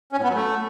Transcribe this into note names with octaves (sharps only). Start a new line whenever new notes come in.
C#4
A2
B3
F#3
A3